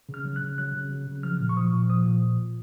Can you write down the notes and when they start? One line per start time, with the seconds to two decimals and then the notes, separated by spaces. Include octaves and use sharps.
0.09 C#3
0.14 F6
0.25 F#3
0.36 F#6
0.42 C#3
0.58 F#3 F#6
0.75 C#3
0.91 F#3
1.08 C#3
1.23 F3 F6
1.40 A#2
1.49 C#6
1.57 F3 D#6
1.73 A#2
1.90 F3 D#6
2.06 A#2